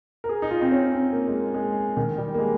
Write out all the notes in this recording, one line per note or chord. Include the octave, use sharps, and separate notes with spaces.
A#4
G#4
D#4
F4
C4
C#4
C4
A#3
G#3
A#3
G#3
D#3
G3
A#3
G#3